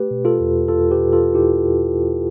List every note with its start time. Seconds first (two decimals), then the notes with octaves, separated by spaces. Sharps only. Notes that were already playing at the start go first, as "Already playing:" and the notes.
Already playing: A3 G4 B4
0.11 B2
0.25 F4 A4
0.40 E2
0.68 E2 F4 A4
0.91 G4 B4
0.98 B2
1.13 F4 A4
1.34 E4 G4